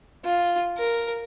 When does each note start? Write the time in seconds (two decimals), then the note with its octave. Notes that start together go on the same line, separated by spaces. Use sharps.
0.24 F4
0.77 A#4